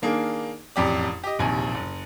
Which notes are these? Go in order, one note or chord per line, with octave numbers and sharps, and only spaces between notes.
D#3 A#3 D4 G#4
E1 A1 F2 G4 D5
G4 D#5
E1 A#1 D#2 C3 G#5
F#1